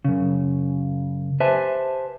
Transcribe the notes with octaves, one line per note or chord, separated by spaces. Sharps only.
F#2 C#3
G4 B4 C5 E5 G#5 A5